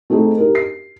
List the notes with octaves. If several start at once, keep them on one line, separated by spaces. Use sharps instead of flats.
A3 C4 D#4 G#4 A4
D#4 G4 A#4
C7